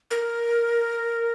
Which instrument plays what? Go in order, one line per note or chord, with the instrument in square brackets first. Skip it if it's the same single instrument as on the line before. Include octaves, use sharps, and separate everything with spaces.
[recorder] A#4